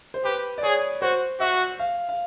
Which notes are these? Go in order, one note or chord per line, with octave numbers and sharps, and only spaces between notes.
C5
G4 B4
D5
G#4 C#5
F#4 C5
F#4 E5
F5
F5